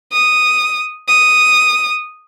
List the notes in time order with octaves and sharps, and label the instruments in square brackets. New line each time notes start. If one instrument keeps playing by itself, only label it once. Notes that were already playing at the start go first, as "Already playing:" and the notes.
[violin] D#6
D#6